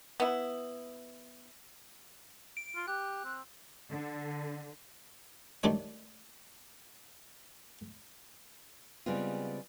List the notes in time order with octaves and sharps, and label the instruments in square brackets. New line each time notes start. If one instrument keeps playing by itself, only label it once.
[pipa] B3 E4
[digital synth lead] D7
[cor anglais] F4
[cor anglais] G4 [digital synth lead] F#6
[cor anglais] C4
[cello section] D3
[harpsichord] D#3 G3 A3 D4 C#5
[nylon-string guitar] C#3 G3 G#3 B3 C4 F4